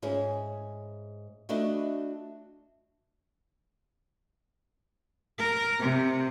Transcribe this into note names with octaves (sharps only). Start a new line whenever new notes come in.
G#2 C#4 E4 G#4
A3 D4 E4 F#4 A4 D#5
A#4
C3